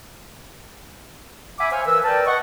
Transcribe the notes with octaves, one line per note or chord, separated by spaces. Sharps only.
E5 F#5 G#5 B5 D6
C5 C#5 E5 F5 G#5
E3 A#4 B4 E6
A#4 B4 D5 G5 A5
D#5 F#5 C#6